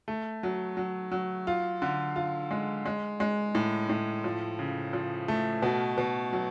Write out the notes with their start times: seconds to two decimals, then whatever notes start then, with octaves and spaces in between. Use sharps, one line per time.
0.08 A3
0.43 F#3
0.77 F#3
1.11 F#3
1.47 F4
1.82 D3
2.16 F4
2.51 G#3
2.86 G#3
3.20 G#3
3.55 A2
3.89 A2
4.24 F3
4.59 C#3
4.93 F3
5.28 A3
5.62 B2
5.98 B2
6.33 F#3